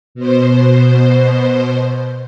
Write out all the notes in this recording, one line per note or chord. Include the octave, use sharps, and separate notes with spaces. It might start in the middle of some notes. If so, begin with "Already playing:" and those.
B2 C5